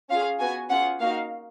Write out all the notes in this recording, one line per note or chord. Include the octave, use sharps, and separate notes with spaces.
C#4 F4 G#4 F5
B3 F#4 G#5
C#4 F4 G#4 F#5
A#3 D#4 F#4 F5